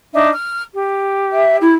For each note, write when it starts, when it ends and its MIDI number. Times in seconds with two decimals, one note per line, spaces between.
0.13 0.29 62
0.13 0.29 63
0.13 0.29 76
0.33 0.61 89
0.74 1.72 67
1.32 1.57 76
1.61 1.75 64